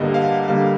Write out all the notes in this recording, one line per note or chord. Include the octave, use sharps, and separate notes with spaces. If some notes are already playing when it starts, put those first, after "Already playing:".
Already playing: G2 D3 G3 A#3 D#5
F5
D3 G3 A#3 F5